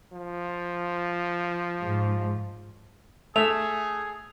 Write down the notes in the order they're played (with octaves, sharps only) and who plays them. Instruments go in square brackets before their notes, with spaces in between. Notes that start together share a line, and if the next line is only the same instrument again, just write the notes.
[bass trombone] F3
[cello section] G#2
[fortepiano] A3 [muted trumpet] G#4 [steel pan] E5 [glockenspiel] F7